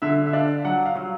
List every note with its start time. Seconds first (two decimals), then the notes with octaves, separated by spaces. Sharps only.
0.02 D3 E5
0.26 E5
0.33 D4 F5
0.65 F#3 F#5
0.86 F5
0.96 F#3